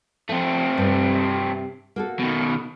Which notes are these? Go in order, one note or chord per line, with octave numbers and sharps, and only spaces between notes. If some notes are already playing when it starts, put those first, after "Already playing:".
F3 A3 C4
G2 C3
A#3 F#4 A4
B2 D#3